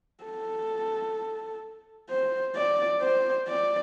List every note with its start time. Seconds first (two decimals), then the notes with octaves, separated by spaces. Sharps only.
0.24 A4
2.09 C5
2.56 D5
3.02 C5
3.48 D5